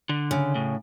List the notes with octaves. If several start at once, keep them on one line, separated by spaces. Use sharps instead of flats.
D3
C#3
A2